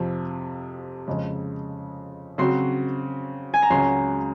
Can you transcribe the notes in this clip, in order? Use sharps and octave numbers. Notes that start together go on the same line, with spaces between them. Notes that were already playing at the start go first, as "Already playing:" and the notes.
Already playing: F2 C3 F3
F2 C#3 G#3
C#3 F#3 C4 F#4 C6
G#5
A#5
C#2 C#3 F#3 C#4 F#4 C6